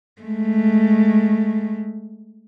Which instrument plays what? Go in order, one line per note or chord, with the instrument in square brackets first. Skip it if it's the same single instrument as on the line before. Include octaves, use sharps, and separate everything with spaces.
[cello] G#3 A3